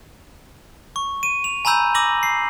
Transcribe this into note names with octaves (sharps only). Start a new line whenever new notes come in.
C#6
D#7
F7
G#5 A#5 B5 E6 G6
D6 E6 A#6 F#7
C7